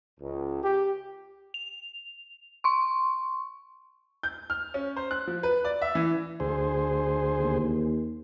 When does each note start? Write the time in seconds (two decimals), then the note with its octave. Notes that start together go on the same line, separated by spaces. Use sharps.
0.20 C#2
0.63 G4
1.54 F7
2.64 C6 C#6
4.23 G6
4.50 F6
4.74 C#4
4.96 C5
5.11 F#6
5.27 F3
5.43 B4
5.65 D5
5.82 E5
5.95 E3
6.40 D2 G#4 C5
7.39 D#2